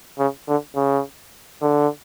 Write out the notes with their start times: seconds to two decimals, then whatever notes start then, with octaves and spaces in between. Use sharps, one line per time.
0.18 C#3
0.47 D3
0.75 C#3
1.62 D3